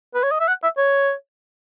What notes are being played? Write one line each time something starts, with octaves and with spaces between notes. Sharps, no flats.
B4
C#5
D#5
E5
F#5
E5
C#5